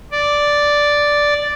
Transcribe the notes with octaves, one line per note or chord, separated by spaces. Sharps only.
D5